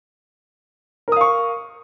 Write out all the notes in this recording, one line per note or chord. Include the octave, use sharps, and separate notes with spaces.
A#4 F5 C#6 D#6